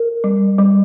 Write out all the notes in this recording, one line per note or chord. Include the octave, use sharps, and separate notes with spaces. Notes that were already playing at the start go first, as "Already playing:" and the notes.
Already playing: A#4
G3
G3